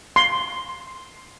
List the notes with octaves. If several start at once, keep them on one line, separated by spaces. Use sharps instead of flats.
C6